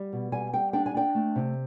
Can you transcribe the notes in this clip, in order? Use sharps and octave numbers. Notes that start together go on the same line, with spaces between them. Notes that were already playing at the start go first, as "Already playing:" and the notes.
Already playing: G3
B2
G3 G#5
G3 G5
D4 G5
G#5
D4 G5
A3
C3